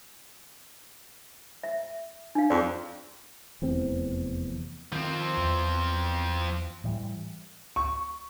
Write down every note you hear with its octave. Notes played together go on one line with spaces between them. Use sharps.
E5
D4 F5
F2 G#4 D5
F1 E2 C4
D#3 F3 C4
E2
A2 E3 G3
C#6